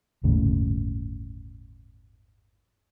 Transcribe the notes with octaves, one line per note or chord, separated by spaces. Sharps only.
G1 D#2 A2 C#3